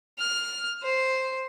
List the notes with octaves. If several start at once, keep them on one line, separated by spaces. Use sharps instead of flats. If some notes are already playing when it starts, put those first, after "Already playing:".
F6
C5